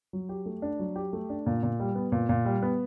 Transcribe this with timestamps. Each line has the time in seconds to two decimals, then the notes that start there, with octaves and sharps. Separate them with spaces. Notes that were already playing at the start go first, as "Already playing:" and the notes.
0.13 F#3
0.29 G4
0.46 A3
0.62 D4
0.79 F#3
0.96 G4
1.13 A3
1.30 D4
1.46 A#2
1.63 A#2
1.80 G3
1.95 B3
2.12 A#2
2.29 A#2
2.45 G3
2.63 B3